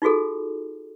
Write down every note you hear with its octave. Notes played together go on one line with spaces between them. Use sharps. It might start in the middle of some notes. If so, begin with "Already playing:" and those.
D#4 F4 F#4 G#4 A4